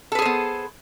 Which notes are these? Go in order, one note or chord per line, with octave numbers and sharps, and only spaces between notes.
B3 G#4 A4 B4 C5